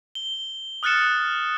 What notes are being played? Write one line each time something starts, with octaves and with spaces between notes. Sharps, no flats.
G7
D#6 F6 F#6 A6 C#7 E7